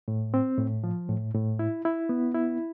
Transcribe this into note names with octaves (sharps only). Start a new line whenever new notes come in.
A2
C4
A2
F3
A2
A2
E4
E4
B3
E4